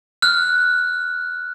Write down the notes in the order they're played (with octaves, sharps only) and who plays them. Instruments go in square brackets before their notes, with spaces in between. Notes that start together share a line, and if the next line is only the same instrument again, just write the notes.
[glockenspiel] F6 F#6